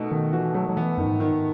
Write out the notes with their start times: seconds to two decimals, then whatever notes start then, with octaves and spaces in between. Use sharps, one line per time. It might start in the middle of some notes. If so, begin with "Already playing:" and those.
Already playing: B2 A3 D#4 F#4
0.11 B2 D#3
0.33 E3 F#4
0.54 F#3 A3
0.69 F#3
0.77 E3 B3
0.98 F#2 D#3
1.06 G#2
1.20 D#3